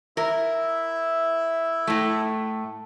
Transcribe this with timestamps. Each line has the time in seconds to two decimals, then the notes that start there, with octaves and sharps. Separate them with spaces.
0.17 E4 A#4 E5
1.87 A2 A3